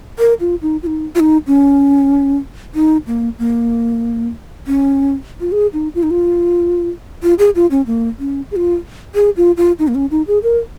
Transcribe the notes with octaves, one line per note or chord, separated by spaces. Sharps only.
A#4
F4
D#4
F4
D#4
F4
D#4
C#4
D#4
A#3
A#3
C#4
F4
G#4
D#4
F4
D#4
F4
F4
G#4
F4
C#4
A#3
C#4
G#4
F4
G#4
F4
F4
D#4
A#3
C#4
D#4
G#4
A#4